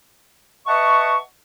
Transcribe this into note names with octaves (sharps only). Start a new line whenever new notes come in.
B4 D#5 E5 F#5 A5 C#6